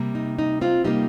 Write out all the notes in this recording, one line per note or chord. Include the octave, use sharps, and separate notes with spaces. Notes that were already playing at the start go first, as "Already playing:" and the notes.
Already playing: C3 G3 A#3
D#4
D#4
C4 F4
C3 G3 A#3 D#4 G4